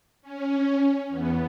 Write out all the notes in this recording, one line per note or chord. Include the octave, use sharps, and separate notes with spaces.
C#4
E2 B3